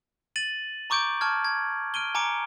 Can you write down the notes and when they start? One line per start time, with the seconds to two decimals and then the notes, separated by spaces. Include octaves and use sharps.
0.36 A6 D#7 F#7
0.90 A#5 C#6 D6 G6 D7
1.21 A5 C#6 F6 G#6
1.45 G#6
1.94 F6 D7 D#7 G7
2.15 G#5 A#5 D6 C#7 D7